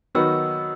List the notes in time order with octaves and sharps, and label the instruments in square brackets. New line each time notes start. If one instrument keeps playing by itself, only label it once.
[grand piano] D#3 F#3 B3 D#4 F#4 [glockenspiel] E6